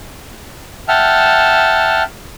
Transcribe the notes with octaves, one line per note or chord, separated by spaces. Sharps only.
E5 F#5 G5 A5 F6